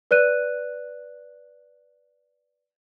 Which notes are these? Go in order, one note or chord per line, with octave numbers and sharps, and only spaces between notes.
B4 D5 F#6 D#7